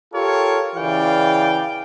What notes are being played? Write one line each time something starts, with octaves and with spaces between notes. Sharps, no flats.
F4 G4 A4 A#4 C#5
C#3 E3 D5 F5 G5